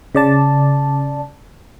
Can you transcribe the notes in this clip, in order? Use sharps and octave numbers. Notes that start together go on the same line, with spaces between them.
C#3 D5 A5